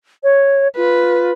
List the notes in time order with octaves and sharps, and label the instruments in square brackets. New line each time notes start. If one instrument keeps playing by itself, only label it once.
[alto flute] C#5
[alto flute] F4 [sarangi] B4